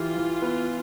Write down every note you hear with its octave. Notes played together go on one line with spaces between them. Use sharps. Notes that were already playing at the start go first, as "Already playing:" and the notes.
Already playing: E3 F4 G4
E3
B3